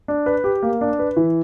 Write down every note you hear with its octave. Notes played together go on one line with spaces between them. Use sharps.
D4
B4
G4
A#3
D4
B4
E3